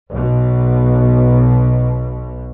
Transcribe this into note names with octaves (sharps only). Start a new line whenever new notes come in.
B1 B2